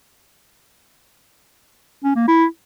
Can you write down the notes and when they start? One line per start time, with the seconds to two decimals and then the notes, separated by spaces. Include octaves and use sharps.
2.04 C#4
2.16 A#3
2.28 E4